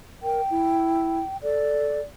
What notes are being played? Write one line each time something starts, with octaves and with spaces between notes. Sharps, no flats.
A#4 G5
E4
A4 D5